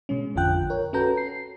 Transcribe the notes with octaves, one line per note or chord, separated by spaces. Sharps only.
B2 G#3 C#4
A1 F2 D3 F4 G5 F#6
A#4 C#5
C#4 F#4 A4 B4 A#5 G6
C7